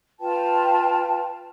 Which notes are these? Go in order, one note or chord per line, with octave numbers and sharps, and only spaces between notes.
F4 B4 G5 A5